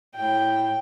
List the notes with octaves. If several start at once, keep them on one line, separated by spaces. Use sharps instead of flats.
A2 G5